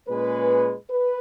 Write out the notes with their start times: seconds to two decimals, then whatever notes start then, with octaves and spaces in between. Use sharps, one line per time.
0.08 A#2 G#3 C#4 G#4 B4
0.90 B4